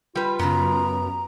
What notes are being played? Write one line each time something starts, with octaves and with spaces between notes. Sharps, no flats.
G3 F4 B4
F#2 C#3 B3 A#5